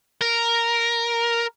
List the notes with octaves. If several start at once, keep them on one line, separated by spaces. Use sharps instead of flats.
A#4